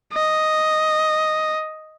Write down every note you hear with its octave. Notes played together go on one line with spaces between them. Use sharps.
D#5